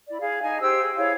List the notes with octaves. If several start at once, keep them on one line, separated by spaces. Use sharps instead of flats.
E4 D5
G#4 F5
D#4 G#5
G4 C5 E6
G#4
E4 G#4 C#5 F5